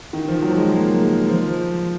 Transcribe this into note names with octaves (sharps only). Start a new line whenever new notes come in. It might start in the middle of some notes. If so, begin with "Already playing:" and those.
D#3
F3
F#3
F#3
G#3
A#3
G#3
F3